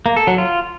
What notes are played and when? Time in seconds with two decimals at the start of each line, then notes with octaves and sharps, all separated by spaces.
0.06 A#3
0.16 A4
0.27 F#3
0.38 F4